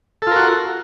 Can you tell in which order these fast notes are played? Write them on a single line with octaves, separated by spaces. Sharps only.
A4 F4 A#4 F#4